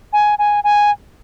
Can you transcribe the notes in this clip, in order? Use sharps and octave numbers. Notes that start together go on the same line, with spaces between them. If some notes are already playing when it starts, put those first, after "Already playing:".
G#5
G#5
G#5